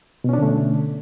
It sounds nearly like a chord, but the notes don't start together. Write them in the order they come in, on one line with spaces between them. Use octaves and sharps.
B2 C#4 D4 D3 A3